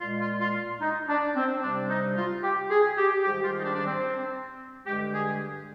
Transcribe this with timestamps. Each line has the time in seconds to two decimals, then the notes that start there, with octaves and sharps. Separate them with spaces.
0.01 A#2 G#3 F4
0.21 F4
0.41 F4
0.81 D#4
1.09 D4
1.36 C4
1.63 C3 G3 D4
1.89 D#4
2.17 F4
2.43 G4
2.70 G#4
2.98 G4
3.24 G#2 D#3 G3 G4
3.44 F4
3.59 D#4
3.65 D4
3.75 D4
3.85 C4
4.86 G2 D3 G#3 G4
5.14 G#4